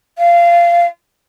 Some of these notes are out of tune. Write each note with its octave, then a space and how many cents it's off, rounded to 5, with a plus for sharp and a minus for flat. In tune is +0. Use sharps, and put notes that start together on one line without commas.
F5 -20